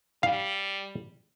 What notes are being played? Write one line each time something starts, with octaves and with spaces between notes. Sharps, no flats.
G3 F5